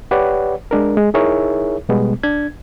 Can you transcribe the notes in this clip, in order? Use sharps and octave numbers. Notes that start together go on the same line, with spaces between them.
G4 B4 C#5 D5 F#5
G#3 D4 A#4
G#3
D#4 E4 G#4 A#4 C#5 E5
B2 G3 G#3 B3
D4 G#6